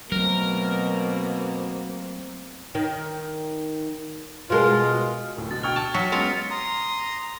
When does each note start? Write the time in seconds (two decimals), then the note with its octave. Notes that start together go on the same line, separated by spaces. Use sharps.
0.12 B2 F#3 A3 A#3 C4 A#4
2.75 D#3
4.50 B2 G#3 F4 A#4
5.37 D1 A2
5.51 B2 D3 A6
5.63 G5 C#6 F6 G#6 F7
5.76 A5
5.94 F#3 F#4 B6
6.12 G#3 B3 C#4 F4 A#4 F5 C#7
6.50 A#5 C6 D#6